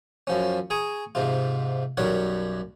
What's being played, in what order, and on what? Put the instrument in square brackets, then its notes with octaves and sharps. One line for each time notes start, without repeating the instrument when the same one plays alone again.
[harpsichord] F#2 F3 C#4
G#4 G#5 A#5 C#6 D#6
G#2 C3 F4
B1 F#2 G3 A#4 C#5 F#5